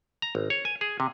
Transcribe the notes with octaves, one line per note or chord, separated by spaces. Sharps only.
A#5
G#1
C#5
G#5
G#4
C3